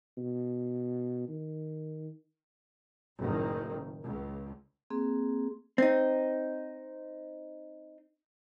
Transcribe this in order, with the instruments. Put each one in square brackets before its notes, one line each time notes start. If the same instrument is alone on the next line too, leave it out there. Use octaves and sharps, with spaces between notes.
[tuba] B2
D#3
[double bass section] F#1 A2 D#3
C#2
[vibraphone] A#3 C4 G#4
[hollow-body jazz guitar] C4 D#4